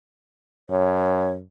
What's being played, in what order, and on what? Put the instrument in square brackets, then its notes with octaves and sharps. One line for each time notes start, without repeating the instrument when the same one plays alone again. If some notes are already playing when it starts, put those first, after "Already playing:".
[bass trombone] F#2 [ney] C#5